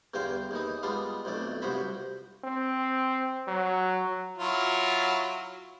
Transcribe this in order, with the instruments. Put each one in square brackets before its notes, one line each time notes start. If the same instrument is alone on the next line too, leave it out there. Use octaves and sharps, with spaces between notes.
[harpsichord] E2 G2 D3 C5 F5 G5
D#2 E3 D#4
G3 G#3 B3 D4 F4
B1 F2 A3 D5
C2 G2 F3 F#4 C5 B5
[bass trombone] C4
F#3
[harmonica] F#3 E4 F4